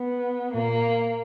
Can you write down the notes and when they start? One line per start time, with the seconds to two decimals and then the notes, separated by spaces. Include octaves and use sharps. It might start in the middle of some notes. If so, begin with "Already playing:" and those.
Already playing: B3
0.52 A#2 A#3